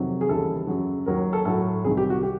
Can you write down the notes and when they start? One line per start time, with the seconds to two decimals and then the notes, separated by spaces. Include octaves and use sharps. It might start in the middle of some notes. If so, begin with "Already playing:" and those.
Already playing: F2 C3 D#3 F#3
0.21 G#4
0.29 D#2 C#3 E3 G3 A4
0.67 F#2 C#3 F#3
1.06 D#2 D#3 F#3 A#4
1.33 A4
1.45 A2 F#3 A4
1.84 C2 C3 D#3 G#4
1.97 G4
2.10 F#4
2.23 G3 G4